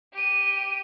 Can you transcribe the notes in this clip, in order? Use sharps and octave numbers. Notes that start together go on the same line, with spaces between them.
G4 D#7